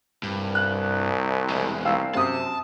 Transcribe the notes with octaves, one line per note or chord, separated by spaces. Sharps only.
C2 G2
F#6
E2 G#3
C2 F5 E6
F#2 C3 A5 D#6